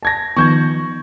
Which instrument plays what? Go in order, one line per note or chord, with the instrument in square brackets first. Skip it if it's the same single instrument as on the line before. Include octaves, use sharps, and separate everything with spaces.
[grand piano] A5 G#6 A#6
[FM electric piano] D#3 F3 B3 [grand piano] C#6 G6 G#6